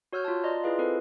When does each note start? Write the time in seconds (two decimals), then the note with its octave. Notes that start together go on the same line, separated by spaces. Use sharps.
0.13 F#4 C#5 E6 F6 G6
0.24 F4 A5
0.43 D5 D#5 A#5 C6
0.63 E4 F4 G#4 B4 D#5 F5
0.79 C4 A4 B4 C5